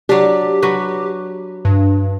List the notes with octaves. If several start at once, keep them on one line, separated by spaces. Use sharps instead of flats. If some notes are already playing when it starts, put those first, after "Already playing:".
F#3 D4 G4
F#3 F#4 B4
G2